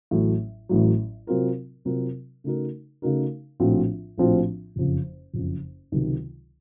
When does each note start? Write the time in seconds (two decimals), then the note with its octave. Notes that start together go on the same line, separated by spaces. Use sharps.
0.11 A1 A2 F#3
0.69 A1 A2 F#3
1.27 C3 F#3 C4 F4 A#4
1.85 C3 F#3 C4 F4 A#4
2.44 C#3 A3 D#4 F#4 A#4
3.02 C#3 A3 D#4 F#4 A#4
3.60 A#1 A2 F3 C4 F#4
4.18 A#1 A2 F3 C4 F#4
4.76 F#1 F2 C#3
5.34 F#1 F2 C#3
5.92 C#2 C3 D#3 F#3